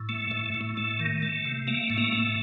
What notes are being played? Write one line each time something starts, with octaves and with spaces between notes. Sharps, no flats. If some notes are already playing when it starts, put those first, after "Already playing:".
Already playing: A2
A3
A2
A2
A3
D#3
A3
C3
A3 A#3
A2
A#3
A3